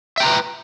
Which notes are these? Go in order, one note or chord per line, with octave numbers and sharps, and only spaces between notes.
B4 E5 G5 A#5